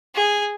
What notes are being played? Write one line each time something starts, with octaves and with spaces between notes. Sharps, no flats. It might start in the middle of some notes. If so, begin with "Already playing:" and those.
G#4